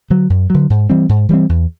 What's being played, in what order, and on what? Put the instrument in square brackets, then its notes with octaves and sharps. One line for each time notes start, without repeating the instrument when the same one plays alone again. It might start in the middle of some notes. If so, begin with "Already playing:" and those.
[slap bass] D3 F#3
F#2
D3 F#3
G#2
E3 G3 C4
G#2
E3 G3 C4
E2